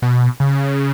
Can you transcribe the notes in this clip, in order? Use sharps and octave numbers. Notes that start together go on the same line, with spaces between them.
B2
C#3